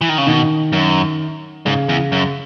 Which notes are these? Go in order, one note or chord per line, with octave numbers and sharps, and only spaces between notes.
E3
D#3
C#3
B2 D#3
F#2
G#2 C#3
E2
F#2